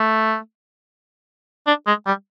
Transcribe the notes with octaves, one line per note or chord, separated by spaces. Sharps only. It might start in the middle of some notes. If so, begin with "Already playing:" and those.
Already playing: A3
D4
G#3
G3